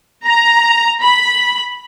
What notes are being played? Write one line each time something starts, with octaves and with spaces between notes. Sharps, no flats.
A#5
B5